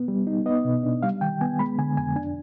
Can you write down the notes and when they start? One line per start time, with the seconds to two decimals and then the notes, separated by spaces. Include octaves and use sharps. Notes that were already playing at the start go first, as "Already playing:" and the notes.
Already playing: B3
0.08 G3
0.27 D#4
0.46 B3 D#5
0.65 B2
0.83 D4
1.03 G3 F5
1.21 D#3 G5
1.41 B3 G#5
1.59 G#3 B5
1.78 D3 G#5
1.97 F2 G#5
2.16 D4 G#5